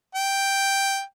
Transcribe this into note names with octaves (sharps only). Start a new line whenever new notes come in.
G5